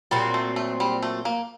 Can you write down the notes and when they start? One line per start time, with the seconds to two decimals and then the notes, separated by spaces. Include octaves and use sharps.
0.11 A#2 F#3 G3 C4 F#4
0.34 A3
0.56 A3
0.80 G3
1.03 A3
1.25 A#3